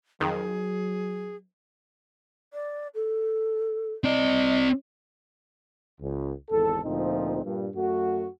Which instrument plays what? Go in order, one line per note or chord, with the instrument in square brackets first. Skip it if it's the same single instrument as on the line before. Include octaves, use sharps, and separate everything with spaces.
[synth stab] F2 D#3 [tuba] F#3 [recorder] G#4
[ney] D5
A4
[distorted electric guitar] C4 D5 [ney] D#5
[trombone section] C#2
G#1 E2 A4
D2 A#2 F3 C4 D#4
G2 A#2
F#2 A3 F#4